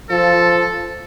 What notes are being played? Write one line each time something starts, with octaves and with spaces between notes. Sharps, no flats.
F3 A4